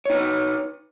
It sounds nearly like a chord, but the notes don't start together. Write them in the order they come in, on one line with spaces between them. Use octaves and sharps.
C#5 D#4 B4